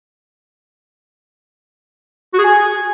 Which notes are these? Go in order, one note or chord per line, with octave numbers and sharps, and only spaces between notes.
F#4
G#4
G#5